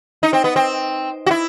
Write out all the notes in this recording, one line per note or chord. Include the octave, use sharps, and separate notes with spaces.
D#4
C4
B3
C4
F#4
E4